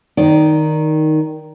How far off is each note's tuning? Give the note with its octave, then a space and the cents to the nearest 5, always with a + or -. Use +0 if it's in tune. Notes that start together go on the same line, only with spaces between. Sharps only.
D#3 +0 D#4 +5 D5 +0